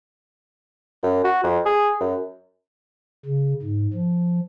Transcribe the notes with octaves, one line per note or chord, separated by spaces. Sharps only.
F#2
F#4
F2
G#4
F#2
C#3
G#2
F3